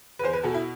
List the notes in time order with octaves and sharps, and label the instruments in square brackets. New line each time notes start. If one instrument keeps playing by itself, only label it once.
[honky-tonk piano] B4
E2 C5
B4
B2 A4
E4